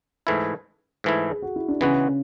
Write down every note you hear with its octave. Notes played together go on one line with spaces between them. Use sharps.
G#2 E3 A3 E4
G#2 E3 A3 E4
G#4
F#4
E4
D4
C#3 E3 G#3 B3 C#4 F#4